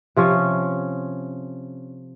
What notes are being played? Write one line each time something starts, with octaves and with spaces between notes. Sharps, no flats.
C3 F3 C#4